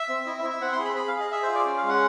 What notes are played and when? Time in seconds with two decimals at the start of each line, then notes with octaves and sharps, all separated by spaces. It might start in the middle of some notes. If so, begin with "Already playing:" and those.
Already playing: E5
0.09 C4
0.26 E4 D#5
0.38 E5
0.44 E4
0.50 E5
0.61 C4 F#5
0.72 C6
0.79 G#4
0.85 B5
0.96 G#4 B5
1.08 F5
1.14 G#4
1.20 D#5
1.31 G#4 E5
1.43 C5
1.48 F4
1.55 D5
1.66 C#4
1.78 F5
1.83 G#3
1.89 F#5